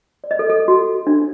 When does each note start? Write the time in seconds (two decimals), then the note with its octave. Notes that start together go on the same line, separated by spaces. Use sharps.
0.24 D5
0.31 D#5
0.39 A4
0.50 A4
0.68 F#4
1.07 D4